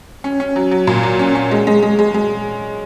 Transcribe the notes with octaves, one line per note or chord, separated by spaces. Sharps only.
C#4
C#4
F#3
F#3
A#2
F#3
C#4
C#4
G#3
G#3
G#3
G#3
G#3